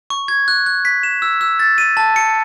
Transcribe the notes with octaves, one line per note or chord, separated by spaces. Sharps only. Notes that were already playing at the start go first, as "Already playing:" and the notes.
C#6
G#6
F#6
F#6
B6
E7
E6
E6
A6
D#7
A5
C#7